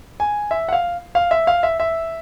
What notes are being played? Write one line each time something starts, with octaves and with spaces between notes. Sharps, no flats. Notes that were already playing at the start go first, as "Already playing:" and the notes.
G#5
E5
F#5
F5
F5
E5
F5
E5
E5